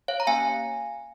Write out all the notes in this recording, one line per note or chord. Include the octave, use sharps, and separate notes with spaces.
C#5 F5
A#5
A#3 C#4 G4 F5 G#5